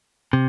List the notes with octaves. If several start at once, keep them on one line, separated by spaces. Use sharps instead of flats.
C3